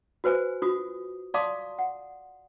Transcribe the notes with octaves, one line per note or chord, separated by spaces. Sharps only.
F#4 B4 C5 G#5
F4 F#4 D#6
D5 F5 A5 C6 D6 D#6
F#5